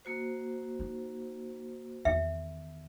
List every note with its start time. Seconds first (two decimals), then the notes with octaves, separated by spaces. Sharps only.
0.05 A#3 F#4 C5
0.79 D#4
2.05 E2 D#3 E5